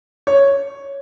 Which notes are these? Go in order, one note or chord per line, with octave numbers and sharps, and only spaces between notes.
C#5